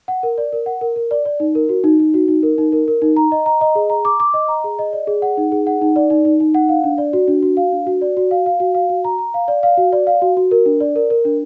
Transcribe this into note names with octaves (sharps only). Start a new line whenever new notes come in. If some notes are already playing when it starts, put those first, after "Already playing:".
F#5
A#4
D5
A#4
F#5
A#4
A#4
D5
D5
D#4
A#4
F#4
D#4
D#4
F#4
D#4
A#4
D#4
A#4
A#4
D#4
A#5
D#5
A#5
D#5
G#4
A#5
D6
D6
D#5
A#5
G#4
D#5
D5
G#4
F#5
D#4
G#4
F#5
D#4
D5
D#4
D#4
D#4
F#5
F5
D4
D5
F#4
D4
F#4
F5
D4
F#4
D5
F#4
F5
F5
F#4
F5
F#4
A#5
A#5
F5
D5
F5
F#4
D5
F5
F#4
F#4
A#4
D4
D5
A#4
A#4
D4